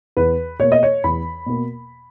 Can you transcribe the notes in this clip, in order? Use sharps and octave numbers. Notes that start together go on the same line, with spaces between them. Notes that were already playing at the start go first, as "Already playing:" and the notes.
E2 B4
B2 A#3 C#5
D#5
C#5
E2 B5
B2 A#3